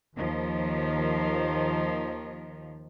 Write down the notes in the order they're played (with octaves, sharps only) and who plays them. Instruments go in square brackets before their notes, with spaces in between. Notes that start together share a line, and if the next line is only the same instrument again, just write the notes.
[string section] D#2 D#3 F3